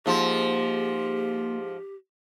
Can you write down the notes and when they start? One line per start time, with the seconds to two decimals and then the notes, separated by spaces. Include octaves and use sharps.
0.06 G#2 F3 A#3 G4 G#4 C6